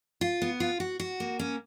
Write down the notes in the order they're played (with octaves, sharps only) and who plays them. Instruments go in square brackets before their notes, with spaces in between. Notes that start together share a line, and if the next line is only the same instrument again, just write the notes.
[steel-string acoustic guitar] F4
B3
F4
F#4
F#4
A#3
C#4